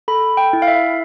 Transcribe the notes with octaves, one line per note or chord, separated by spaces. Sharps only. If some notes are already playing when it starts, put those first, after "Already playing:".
A4 B5
G5
E4
F5
E5